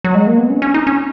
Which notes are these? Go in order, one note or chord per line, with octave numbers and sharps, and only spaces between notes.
F#3
G#3
A#3
B3
C#4
C#4
D#4
C#4